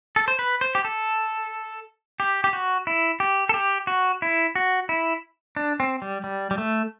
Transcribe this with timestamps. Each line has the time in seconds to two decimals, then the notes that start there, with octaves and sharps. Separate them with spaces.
0.16 A4
0.28 C5
0.39 B4
0.61 C5
0.75 G4
0.85 A4
2.20 G4
2.44 G4
2.53 F#4
2.87 E4
3.20 G4
3.49 A4
3.54 G4
3.87 F#4
4.22 E4
4.55 F#4
4.89 E4
5.56 D4
5.80 C4
6.02 G3
6.24 G3
6.51 G3
6.58 A3